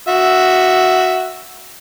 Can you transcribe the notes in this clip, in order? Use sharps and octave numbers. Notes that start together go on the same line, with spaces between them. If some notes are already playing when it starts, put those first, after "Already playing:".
F#4 E5